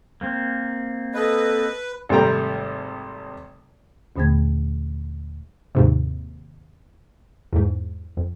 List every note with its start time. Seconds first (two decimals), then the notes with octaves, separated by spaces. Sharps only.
0.21 A#3 C4
1.14 A4 B4 D#5
2.09 G#1 C3 G3 A3 G5 A#5
4.16 D#2 A#2 D3 A3 B3 G#6
5.75 D#2 G#2 C3
7.53 E2 G#2
8.17 F2